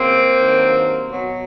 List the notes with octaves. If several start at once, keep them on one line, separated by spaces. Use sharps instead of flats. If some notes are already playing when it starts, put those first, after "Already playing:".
Already playing: F#2 C#3 E3 A#3 C4
G2 D#3 F#3
B2 F#3